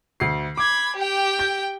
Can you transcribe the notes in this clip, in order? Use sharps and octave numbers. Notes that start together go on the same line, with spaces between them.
D2 C7
B5 D6 G#6
G4 G5
G6